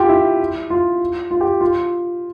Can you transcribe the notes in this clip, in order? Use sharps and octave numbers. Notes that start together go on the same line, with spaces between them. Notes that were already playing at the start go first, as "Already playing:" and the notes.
Already playing: F4 G4
E4
F4
F4
G4
F4